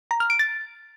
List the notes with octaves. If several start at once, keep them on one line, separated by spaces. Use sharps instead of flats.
A#5
F6
D7
A6